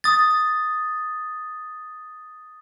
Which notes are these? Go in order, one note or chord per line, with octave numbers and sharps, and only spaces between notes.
D#6 A6